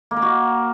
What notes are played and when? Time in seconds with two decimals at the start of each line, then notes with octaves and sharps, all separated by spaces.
0.11 A#3
0.17 A#4
0.22 F#4